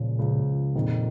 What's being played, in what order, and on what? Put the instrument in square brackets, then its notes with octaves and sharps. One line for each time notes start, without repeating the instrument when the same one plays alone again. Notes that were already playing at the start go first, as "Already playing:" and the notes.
Already playing: [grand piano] C#2 C#3 F3 [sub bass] A#2
[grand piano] C#2 C#3 F3
[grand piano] F2 D#3 A#3 D#4 [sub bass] A#2